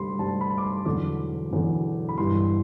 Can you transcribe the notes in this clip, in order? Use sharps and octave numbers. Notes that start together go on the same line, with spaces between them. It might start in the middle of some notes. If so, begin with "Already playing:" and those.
Already playing: D2 C3 G3 B5 C6
D2 C3 G3 A5
B5
D6
C6
E1 E2 D3 F#3 D6
E1 E2 D3 F#3
B5
G1 G2 E3 G3 C6